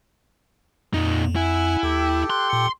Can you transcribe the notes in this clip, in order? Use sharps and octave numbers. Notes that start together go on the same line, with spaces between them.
F2 A#2 D#4
E4 F#5 G#5
D#2 G4 A4 G5
C6 F#6
A#2 C#7